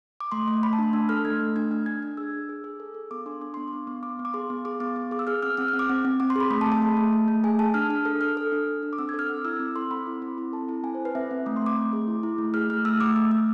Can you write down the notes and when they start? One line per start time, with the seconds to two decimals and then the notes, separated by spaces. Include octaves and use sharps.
0.20 D6
0.32 A3 C6
0.48 A3
0.63 A3 B5
0.73 A5
0.79 D4 C6
0.93 D4 E6
1.09 A4 F6
1.25 A3 G#6
1.40 A3
1.56 D4 G#6
1.71 D4 F6
1.86 D4 G#6
2.03 D4
2.17 G#4 E6
2.33 G#4
2.49 G#4
2.64 G#4
2.80 A4
2.94 A4
3.11 B3 D6
3.26 D4 C6
3.41 D4 D6
3.54 B3 C6
3.68 B3 D6
3.87 B3
4.03 B3 D6
4.19 B3
4.25 D6
4.34 G#4 C6
4.50 B3
4.65 G#4 D6
4.80 B3 D6
4.96 B3
5.11 G#4 D6
5.19 E6
5.27 G#4 F6
5.43 C4 F6
5.57 C4 F6
5.68 F6
5.74 C4
5.79 D6
5.89 C4
6.05 C4
6.20 C4 D6
6.30 C6
6.36 G#4 B5
6.50 A3 B5
6.61 A5
6.66 A3
6.72 A5
6.82 G#4
6.97 A3
7.13 A3
7.28 A3
7.44 G#4 G#5
7.59 G#4 A5
7.74 D4 F6
7.90 D4 F6
8.05 A4 F6
8.21 A4 F6
8.37 A4
8.52 D4
8.68 D4
8.83 D4
8.93 D6
8.98 C4 E6
9.09 G#6
9.14 A4
9.19 F6
9.29 C4 F6
9.45 E4 E6
9.60 C4 D6
9.76 A4 C6
9.91 C4 B5
10.06 E4 D6
10.22 C4
10.38 E4 B5
10.53 A4 A5
10.68 E4 A5
10.83 C4 G#5
10.95 C5
11.00 A4
11.05 B4
11.15 C4 E5
11.31 C4
11.46 A3 D6
11.56 C6
11.62 A3 D6
11.76 A3
11.93 G#4
12.08 E4
12.23 E4
12.38 A3
12.54 G#4 F6
12.70 A3 F6
12.85 A3 E6
13.01 A3 D6
13.16 A3 D6
13.31 A3 E6